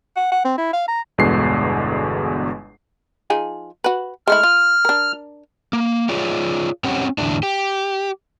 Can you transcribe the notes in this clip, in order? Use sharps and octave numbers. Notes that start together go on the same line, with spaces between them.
F#5
F#5
C4
E4
F5
A#5
G1 E2 B2 D3 G#3 C7
F3 D#4 G#4
F#4 B4
G#3 A3 E4 F6
F4
D4 A#4
A#3
F4 G#4 C#5 D5
C4 C#4 G4 C#5 F#5
E2 A2 D3 A3 D4
G4